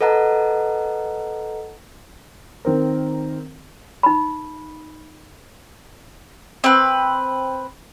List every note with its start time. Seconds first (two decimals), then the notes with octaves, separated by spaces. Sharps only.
0.01 A4 B4 D#5 F#5 A5 A#5
2.65 D#3 C4 A#4
4.03 D#4 B5
6.64 C4 B4